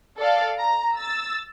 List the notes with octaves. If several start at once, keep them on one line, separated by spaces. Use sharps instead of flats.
A4 D5 F5
A#5
E6 A6